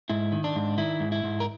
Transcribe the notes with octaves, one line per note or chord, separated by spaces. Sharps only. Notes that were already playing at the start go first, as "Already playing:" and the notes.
G#2 E4
D#3
D4
G#2
D#3 E4
G#2
E4
G#2
A#4